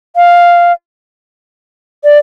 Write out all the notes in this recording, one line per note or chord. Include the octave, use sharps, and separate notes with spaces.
F5
D5